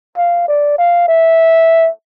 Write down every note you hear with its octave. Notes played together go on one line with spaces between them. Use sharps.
F5
D5
F5
E5